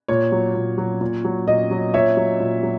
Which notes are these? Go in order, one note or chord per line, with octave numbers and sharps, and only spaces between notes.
A#2 C#5
F#3
A#2
F#3
A#2
F#3
A#2 D#5
F#3
A#2 C#5 E5
F#3
A#2
F#3